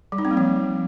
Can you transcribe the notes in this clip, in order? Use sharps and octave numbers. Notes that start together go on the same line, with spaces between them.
G3
D#4
C4
A#3
F3